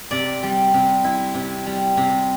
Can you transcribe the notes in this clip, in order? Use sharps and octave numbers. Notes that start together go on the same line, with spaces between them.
C3 D5
G3
C3
E4
C3
G3
C3